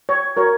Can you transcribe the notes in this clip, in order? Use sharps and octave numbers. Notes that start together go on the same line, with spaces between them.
C#5
F#4 A#4 C#5